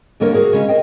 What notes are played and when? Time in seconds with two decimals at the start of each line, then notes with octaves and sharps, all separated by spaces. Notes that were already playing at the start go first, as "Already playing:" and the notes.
0.20 E2 D3 G3 A#3 A#4 C#5
0.34 F#4 G#4 A#4
0.53 C#3 G#3 C#4 F5
0.68 A#4 C5 D#5 G5